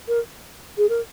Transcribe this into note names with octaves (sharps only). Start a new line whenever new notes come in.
A#4
G#4
A#4